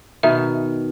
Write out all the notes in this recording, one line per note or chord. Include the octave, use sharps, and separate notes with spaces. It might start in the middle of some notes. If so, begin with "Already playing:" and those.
B2 D#3 E5